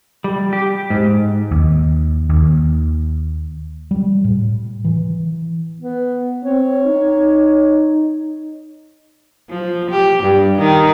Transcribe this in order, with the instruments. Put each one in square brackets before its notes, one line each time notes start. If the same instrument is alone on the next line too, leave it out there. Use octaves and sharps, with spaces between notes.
[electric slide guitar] G3
G4
G#2
[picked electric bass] D#2
D#2
[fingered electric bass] G3
A2
E3
[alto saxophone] B3
[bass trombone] C4 [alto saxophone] C#5
[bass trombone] D#4
[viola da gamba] F3
G4
G2
D#3